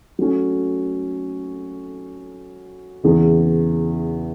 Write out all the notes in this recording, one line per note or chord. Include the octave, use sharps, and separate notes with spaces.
F#3 A3 C#4
E2 C#3 E3